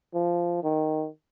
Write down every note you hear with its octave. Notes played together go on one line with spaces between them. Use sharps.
F3
D#3